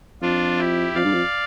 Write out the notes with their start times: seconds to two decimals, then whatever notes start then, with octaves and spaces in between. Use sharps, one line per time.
0.22 F2 D4 F4
0.59 E4 G4
0.95 F2 D5 F5
1.04 G2
1.13 F2